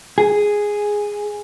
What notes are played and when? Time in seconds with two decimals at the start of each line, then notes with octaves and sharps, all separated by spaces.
0.18 G#4